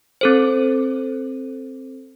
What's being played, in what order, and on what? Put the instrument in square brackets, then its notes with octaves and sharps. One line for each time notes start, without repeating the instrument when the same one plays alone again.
[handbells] C4 A4 C5